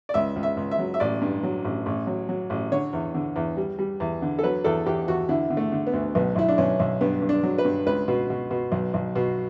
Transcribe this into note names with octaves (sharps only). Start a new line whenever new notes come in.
D5
C#2 E5
C#2
E5
C#2
E5
F#3
E5
A1 D5
G2
F#3
A1
A1
F#3
F#3
A1
D3 C#5
E2
D3
E2
G3
G3
E2
D3
A4
F#3 B4
E2 A4
E2 G4
E2 F#4
D3 E4
D3
A3
D3
B3
D2
B1 B3
B1 E4
D4
B1 C#4
B1
G2 B3
G2
D4
F#3
B4
G2
C#2 B4
B2
B2
B2
B1
B1
B2